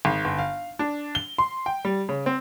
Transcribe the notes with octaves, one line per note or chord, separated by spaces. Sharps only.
G#1
G1
F5
D4
G7
C6
G5
G3
C#3
C4